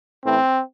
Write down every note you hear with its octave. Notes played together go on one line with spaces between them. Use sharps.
A1 A2 E3 C4